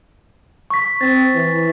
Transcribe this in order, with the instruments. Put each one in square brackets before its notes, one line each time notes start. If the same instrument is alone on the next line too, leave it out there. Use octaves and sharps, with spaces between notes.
[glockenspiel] C#6 B6
[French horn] C4 [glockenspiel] A6
[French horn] E3